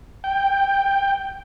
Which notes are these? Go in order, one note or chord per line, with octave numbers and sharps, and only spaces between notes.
G5